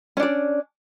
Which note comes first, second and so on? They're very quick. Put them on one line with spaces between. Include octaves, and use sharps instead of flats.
C#4 D4 D5